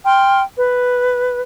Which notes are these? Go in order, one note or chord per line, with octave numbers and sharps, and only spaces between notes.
G5 C6 F6
B4